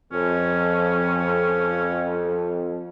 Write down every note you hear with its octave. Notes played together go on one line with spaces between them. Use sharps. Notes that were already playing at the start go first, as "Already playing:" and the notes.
F2 C#4